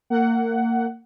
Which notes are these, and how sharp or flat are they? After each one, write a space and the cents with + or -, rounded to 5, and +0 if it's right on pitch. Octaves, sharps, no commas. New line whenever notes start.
A#3 -25 F#5 +15